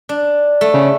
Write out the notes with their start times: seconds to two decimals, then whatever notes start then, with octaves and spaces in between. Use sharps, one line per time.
0.09 D4
0.61 A3
0.74 C#3